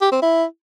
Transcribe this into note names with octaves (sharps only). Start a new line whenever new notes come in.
G4
C4
E4